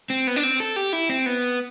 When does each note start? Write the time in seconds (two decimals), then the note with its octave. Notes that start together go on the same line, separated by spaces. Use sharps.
0.10 C4
0.27 B3
0.36 D4
0.43 C4
0.60 A4
0.76 G4
0.93 E4
1.09 C4
1.26 B3